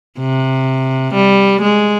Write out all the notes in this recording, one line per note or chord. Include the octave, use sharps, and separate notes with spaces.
C3
G3
G#3